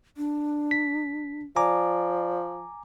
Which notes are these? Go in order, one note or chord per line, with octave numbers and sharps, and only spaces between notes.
D4
B6
F3 D5 G#5 A#5 D6